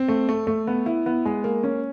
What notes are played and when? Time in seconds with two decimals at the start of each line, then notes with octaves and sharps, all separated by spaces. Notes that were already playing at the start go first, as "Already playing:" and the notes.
Already playing: C4
0.08 A3
0.29 A3
0.47 A3
0.67 B3
0.86 E4
1.06 B3
1.25 G#3
1.44 A#3
1.63 C#4